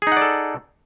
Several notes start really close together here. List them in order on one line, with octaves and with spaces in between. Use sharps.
G#4 D#4 F#5 D5 A4